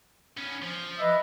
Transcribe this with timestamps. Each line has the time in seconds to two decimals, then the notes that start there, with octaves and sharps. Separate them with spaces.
0.37 B3 C#4
0.62 F3
0.98 B4 D#5 E5